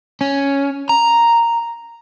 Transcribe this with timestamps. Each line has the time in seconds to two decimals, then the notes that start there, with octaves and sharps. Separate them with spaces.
0.21 C#4
0.89 A#5